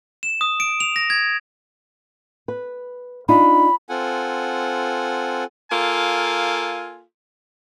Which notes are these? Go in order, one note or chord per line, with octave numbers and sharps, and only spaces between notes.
E7
D#6
D7
F7
A#6
G#6
B4
D4 D#4 F4 B5
C4 F4 A4 F#5 G#5
A#3 F4 A4 F5 G#5